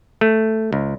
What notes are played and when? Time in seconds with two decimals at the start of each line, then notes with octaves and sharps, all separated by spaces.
0.21 A3
0.73 C#2